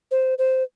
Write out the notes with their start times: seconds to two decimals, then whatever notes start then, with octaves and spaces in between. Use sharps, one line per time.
0.11 C5
0.38 C5